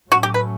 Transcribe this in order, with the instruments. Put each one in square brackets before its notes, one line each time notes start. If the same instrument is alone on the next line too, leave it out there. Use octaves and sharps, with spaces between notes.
[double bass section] A2 F#3 A3 C#4 [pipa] F#4
[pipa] G4
B4